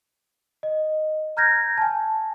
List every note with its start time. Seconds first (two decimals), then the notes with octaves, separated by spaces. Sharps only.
0.63 D#5
1.37 A#5 F6 G6 G#6 A#6
1.78 G#5 A5